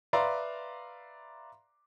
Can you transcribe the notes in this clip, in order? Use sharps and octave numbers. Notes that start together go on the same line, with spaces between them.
B4 D5 E5 F5 A#5 C6